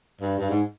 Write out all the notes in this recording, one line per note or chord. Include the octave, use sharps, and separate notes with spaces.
G2
G2
G#2